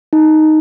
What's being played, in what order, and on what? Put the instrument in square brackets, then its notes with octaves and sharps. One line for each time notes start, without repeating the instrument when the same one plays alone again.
[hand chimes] D#4